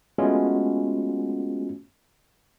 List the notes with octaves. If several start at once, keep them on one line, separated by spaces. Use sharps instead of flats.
G#3 A3 B3 C#4 F4 F#4